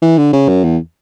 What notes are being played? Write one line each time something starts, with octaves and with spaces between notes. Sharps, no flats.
E3
D3
C#3
F#2
E2